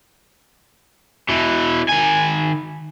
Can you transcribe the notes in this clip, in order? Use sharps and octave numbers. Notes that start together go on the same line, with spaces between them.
B2 E3
D#3 G#5